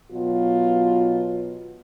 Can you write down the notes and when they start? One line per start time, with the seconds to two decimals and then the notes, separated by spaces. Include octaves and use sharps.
0.12 B2 F#3 B3 F4